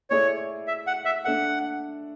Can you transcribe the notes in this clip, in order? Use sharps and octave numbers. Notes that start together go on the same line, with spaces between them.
A3 E4 G#4 C#5 D5
E5
F#5
E5
A3 D4 A4 E5 F#5